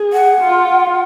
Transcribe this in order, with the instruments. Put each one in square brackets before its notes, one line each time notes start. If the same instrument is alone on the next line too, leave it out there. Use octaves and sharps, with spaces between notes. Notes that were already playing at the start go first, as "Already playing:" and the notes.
Already playing: [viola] G#4
[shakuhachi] F#5
[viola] F4